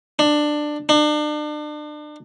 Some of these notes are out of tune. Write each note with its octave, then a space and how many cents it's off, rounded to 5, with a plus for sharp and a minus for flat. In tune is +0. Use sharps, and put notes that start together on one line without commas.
D4 +15
D4 +35